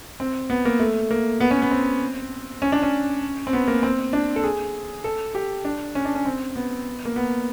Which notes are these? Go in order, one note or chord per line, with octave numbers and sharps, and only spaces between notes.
C4
B3
A#3
A3
A#3
B3
C#4
B3
C4
C#4
D4
C#4
C4
B3
A#3
C4
D4
A4
G#4
A4
G4
D4
C#4
D4
C#4
C4
B3
A#3
B3